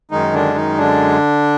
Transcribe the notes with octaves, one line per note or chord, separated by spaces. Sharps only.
F#2 D#3 G#3 D#4
D3 D4
D#3 D#4
D3 D4